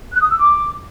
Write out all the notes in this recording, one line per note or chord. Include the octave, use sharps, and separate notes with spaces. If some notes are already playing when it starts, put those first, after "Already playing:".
F#6
D#6
E6
D6